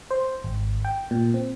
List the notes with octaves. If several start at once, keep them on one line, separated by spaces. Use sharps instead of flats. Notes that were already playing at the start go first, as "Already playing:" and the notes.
C5
G#1
G5
A#2
C4